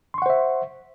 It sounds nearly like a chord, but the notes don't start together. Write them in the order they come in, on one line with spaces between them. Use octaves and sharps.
C6 C#6 F#5 C5 E5